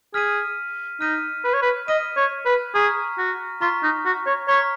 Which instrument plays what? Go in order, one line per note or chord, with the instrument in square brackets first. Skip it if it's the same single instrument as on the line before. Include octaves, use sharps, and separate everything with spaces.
[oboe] G#4 [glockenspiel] F6 B6 D#7
[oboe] D#4 [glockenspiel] F6 B6 D#7
[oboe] B4
C#5
B4
[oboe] D#5 [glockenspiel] F6 B6 D#7
[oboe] C#5
B4
[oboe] G#4 [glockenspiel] A#5 C#6 F6 B6
[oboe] F#4
[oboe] F4 [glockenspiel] A#5 C#6 F6 B6
[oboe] D#4
F#4
C#5
[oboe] C#5 [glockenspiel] A#5 C#6 F6 B6